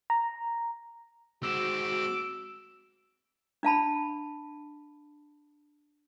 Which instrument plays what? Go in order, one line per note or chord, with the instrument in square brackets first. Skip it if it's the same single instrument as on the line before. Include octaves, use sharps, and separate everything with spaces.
[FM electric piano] A#5
[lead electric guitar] G#3 C4 [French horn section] F#4 [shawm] D6 [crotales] E6 E7
[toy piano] D4 F5 A5 B5